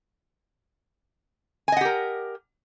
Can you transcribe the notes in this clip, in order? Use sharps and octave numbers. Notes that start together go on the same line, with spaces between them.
G4 A#4 D#5 F#5 G#5